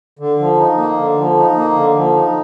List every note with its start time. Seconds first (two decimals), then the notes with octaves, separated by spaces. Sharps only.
0.19 D3
0.39 F3
0.58 D#4
0.77 A#3
0.97 D3
1.17 F3
1.37 D#4
1.56 A#3
1.76 D3
1.96 F3
2.15 D#4